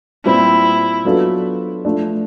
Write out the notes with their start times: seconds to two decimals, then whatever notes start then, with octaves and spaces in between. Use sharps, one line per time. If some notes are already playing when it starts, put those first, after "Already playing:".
0.24 A#2 G3 C4 E4
1.05 F#3 B3 D4 F4 A4
1.85 F3 A3 D4